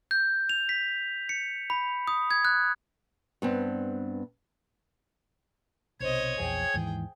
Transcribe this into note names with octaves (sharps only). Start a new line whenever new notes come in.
G6
F7
B6
C#7
B5
D#6
G#6
F#6
G2 B3 C4
B1 C3 C5 C#5 D#5 G#6
A#1 E2 A#2 G#4 G5
D#2 G#2 E3